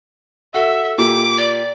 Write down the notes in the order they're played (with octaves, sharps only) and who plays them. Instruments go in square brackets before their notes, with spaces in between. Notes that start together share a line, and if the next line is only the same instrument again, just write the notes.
[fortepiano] F#4 [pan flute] A4 [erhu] E5
[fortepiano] A#2 G4 [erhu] D6
[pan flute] D5